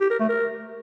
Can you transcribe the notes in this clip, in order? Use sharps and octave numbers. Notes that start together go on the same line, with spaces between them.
G4
A#4
A3
A#4